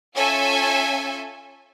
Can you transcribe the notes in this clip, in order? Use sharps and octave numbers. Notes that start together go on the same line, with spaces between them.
C#4 F4 A4 E5 G#5